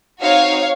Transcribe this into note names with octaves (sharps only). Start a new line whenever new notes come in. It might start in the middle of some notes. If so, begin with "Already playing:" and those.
C4 D#4 F#4 C#5 F5